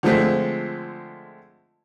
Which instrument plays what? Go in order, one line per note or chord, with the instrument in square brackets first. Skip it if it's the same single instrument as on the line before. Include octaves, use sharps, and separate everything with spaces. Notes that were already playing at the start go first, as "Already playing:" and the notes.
[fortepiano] D3 F3 G#3 A3 C4